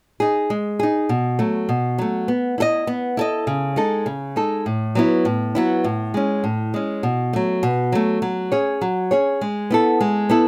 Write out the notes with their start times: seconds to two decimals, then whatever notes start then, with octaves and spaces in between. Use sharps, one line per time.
0.20 D#4 G#4
0.50 G#3
0.79 D#4 G#4
1.09 B2
1.39 F#3 A3
1.69 B2
1.98 F#3 A3
2.28 B3
2.58 E4 A4 D#5
2.87 B3
3.17 E4 A4 D#5
3.47 C#3
3.76 G#3 D#4 A4
4.06 C#3
4.36 G#3 D#4 A4
4.66 A2
4.95 F#3 B3 E4
5.25 A2
5.55 F#3 B3 E4
5.84 A2
6.14 G#3 C#4
6.44 A2
6.74 G#3 C#4
7.03 B2
7.33 F#3 A3
7.63 B2
7.92 F#3 A3
8.22 F#3
8.52 C#4 G#4 C#5
8.81 F#3
9.11 C#4 G#4 C#5
9.41 G#3
9.71 B3 E4 A4
10.01 G#3
10.29 B3 E4 A4